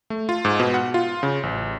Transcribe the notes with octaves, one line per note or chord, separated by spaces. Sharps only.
A3
F4
G#2
B2
F#5
F4
C#3
A1